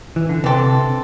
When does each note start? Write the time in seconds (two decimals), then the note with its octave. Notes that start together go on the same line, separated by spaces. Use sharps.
0.16 E3
0.29 D3
0.44 C3 E3 C4 A4